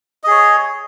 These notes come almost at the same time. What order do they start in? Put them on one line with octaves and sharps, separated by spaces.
D#5 G#4 C#5